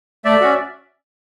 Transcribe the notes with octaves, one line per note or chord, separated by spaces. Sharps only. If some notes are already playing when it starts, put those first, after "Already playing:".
A3 D5 E5
C#4 F#4